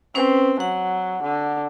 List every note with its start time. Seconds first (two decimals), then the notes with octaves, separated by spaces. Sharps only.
0.15 C4 C#4 B4 C5
0.60 F#3 F#5
1.23 D3